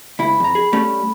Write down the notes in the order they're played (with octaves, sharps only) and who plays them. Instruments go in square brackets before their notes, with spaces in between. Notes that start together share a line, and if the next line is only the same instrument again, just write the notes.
[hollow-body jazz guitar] C#2 E4 [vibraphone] B5
[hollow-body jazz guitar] F2 A#5
G#4
G3 A3 C#4